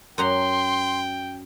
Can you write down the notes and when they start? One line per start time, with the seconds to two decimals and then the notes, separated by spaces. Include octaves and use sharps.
0.18 F#2 F#5 G5 A#5 C6